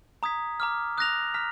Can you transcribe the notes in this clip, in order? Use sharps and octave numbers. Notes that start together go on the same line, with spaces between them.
A#5 D#6 G#6 B6
A#5 D6 F6
D#6 F#6 A#6 F7
A#5 F6 B6